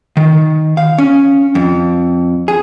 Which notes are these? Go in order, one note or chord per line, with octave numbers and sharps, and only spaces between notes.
D#3
F5
C#4
F2
G#4